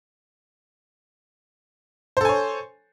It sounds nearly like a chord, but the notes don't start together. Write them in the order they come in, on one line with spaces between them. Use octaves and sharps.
C5 A4 G#5 C#5